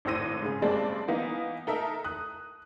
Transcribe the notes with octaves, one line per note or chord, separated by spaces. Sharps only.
G#1 A2 C5 E6 A#6 D#7
G#2 C#3
F#1 G2 G#3 C4 D5 A5
E3 A#3 B3 D#4
D#4 A4 A#4 E5
D#6 F#6